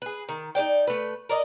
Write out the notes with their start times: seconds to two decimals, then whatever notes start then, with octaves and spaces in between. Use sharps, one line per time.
0.02 G#4 B4
0.29 D#3
0.55 D#4 G4 D5 G5
0.87 A3 B4
1.29 A#4 D5 D#5